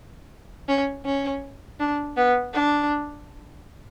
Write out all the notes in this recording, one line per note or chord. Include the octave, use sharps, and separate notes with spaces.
C#4
C#4
D4
B3
D4